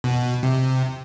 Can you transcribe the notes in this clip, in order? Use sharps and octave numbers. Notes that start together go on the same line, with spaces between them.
B2
C3